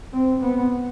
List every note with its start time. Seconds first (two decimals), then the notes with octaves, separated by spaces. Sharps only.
0.13 C4
0.41 B3